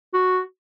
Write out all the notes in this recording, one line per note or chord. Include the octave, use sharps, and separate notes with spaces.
F#4